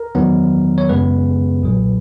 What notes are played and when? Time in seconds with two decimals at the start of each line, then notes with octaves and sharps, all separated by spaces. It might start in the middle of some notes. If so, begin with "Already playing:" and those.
Already playing: A#4
0.15 E2 D#3 F#3 B3
0.78 C#5
0.89 F#2 C#3 G#3 B3 B4
1.63 B1 A#2 F#3